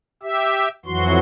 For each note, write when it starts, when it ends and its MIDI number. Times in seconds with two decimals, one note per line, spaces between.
0.23 0.68 67
0.23 0.68 76
0.86 1.19 41
0.86 1.19 52
0.86 1.19 54
0.86 1.19 66
0.86 1.19 84